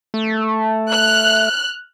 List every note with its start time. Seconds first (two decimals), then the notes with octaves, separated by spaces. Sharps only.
0.14 A3
0.91 F6 F#6